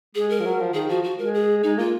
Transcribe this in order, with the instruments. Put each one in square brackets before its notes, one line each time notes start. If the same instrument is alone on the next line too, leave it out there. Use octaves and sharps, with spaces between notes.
[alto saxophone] G#3 [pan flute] G#4
[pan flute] A#4
[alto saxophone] F3
F#3
F3
[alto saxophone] D#3 [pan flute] G#4
[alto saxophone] F3 [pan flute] F#4
[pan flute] F#4
[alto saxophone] G#3 [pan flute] A#4
[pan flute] G#4
[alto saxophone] G#3 [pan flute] D#4
[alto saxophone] A#3 [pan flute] F4